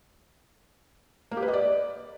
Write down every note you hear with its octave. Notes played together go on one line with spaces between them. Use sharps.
A#3
G4
B4
D#5
D5